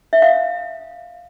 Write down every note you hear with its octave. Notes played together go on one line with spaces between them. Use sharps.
E5
F5